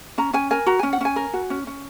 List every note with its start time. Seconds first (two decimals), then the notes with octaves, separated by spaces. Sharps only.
0.18 C#4 A#5
0.33 C#4 G#5
0.51 A#4 G#5
0.66 F#4 A#5
0.79 C#4 G#5
0.93 F#5
1.01 C#4 G#5
1.16 A#4
1.33 F#4
1.50 C#4
1.67 C#4